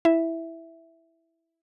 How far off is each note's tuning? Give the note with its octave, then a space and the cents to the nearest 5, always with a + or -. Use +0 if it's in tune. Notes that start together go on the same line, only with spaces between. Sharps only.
E4 +0 E5 +0